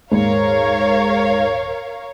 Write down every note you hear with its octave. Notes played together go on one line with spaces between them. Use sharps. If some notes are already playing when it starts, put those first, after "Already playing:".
D#1 G#2 A#4 C#5 F5